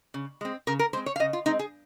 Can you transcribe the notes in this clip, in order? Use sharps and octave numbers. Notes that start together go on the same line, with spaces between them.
C#3
G#3 C4
C#3 A#4
A#4
G#3 C4 C5
C#5
F5
C#3 D#5
F4
G#3 C4 D#4
G#4